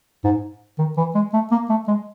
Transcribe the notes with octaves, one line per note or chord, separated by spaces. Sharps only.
G#2
D#3
E3
G#3
A3
A#3
A3
G#3